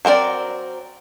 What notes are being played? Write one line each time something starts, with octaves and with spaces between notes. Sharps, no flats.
F#3 C4 A#4 D5